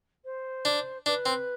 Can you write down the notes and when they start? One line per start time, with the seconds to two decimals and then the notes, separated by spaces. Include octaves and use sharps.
0.24 C5
0.65 D4
1.06 D4 B4
1.26 C4